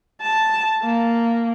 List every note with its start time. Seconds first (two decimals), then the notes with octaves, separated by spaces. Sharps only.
0.22 A5
0.83 A#3